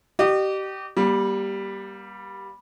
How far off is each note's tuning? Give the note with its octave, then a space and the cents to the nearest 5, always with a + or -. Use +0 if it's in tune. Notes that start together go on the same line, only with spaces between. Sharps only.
G4 -25 D#5 -40
G3 +0 A#3 +40